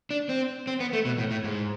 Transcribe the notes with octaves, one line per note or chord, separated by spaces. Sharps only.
D4
C4
C4
B3
A3
B2
A2
A2
G#2